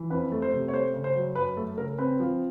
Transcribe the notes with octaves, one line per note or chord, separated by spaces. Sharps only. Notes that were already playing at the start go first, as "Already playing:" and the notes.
Already playing: E3
F2 B4
A3
C5
C3
C#5
A3 C5
C#3
C5
F#3
F#2 B4
A3 A4
C#3 A#4
C4 B4
F3